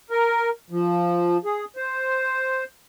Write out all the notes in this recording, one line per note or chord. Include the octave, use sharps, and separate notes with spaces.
A#4
F3
G#4
C5